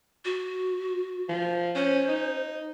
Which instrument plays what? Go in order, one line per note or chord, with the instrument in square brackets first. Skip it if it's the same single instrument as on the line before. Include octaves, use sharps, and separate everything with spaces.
[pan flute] F#4
[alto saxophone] F3
[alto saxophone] C#4 [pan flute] C5
[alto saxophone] D#4